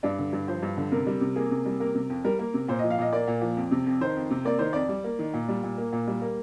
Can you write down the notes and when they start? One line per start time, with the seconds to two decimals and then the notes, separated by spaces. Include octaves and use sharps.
0.03 G2 D4
0.19 D3
0.33 G2
0.48 F3 C5
0.63 G2
0.77 D3
0.92 C3 A#4
1.07 G3
1.21 C3
1.36 A#3 G#4
1.51 C3
1.66 G3
1.80 A#3 A#4
1.95 C3
2.10 F2
2.24 G3 A#4
2.39 A#3
2.54 C3
2.68 A#2 C5
2.79 F3 D#5
2.90 F5
2.98 A#2 D#5
3.13 A#3 D5
3.27 A#2
3.42 F3
3.57 F2
3.71 C3
3.86 F2
4.01 D#3 C5
4.16 F2
4.31 C3
4.45 A#3 D5
4.59 D#3 C5
4.73 F2 D5
4.89 G3
5.04 A#3
5.19 D#3
5.33 A#2
5.48 G3
5.63 A#2
5.78 A#3
5.92 A#2
6.07 G3
6.22 A#3